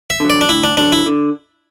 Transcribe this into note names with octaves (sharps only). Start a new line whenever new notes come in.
E5
D3 F#3
D5
D4
D2 E4
D4
D3 F#3 D4
E4
D3